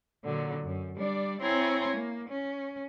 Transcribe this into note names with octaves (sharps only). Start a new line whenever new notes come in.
A#2 D3 F#3
F#2
G3 D4 D5
C4 E4 C#5 G#5 A#5 C6
A#3
C#4